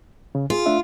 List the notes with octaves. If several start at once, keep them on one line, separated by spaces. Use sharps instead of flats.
C#3
F4 G#4
A3 D4 E5